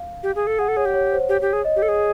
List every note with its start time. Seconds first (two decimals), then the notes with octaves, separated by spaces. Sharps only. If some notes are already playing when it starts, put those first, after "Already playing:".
Already playing: F5
0.23 G4
0.36 G#4
0.47 A4
0.59 G#4 F#5
0.68 A4
0.76 G#4 C#5
0.85 G4
0.94 C#5
1.12 C5
1.29 G4 C#5
1.41 G4
1.53 G#4
1.64 D#5
1.76 G4
1.82 A4
1.89 G#4